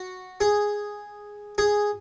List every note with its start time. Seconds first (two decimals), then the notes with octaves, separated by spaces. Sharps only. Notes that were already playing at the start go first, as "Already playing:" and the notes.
Already playing: F#4
0.41 G#4
1.58 G#4